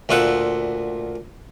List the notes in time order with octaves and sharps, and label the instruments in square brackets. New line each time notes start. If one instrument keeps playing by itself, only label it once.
[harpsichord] D2 A#2 F4 E5 F#5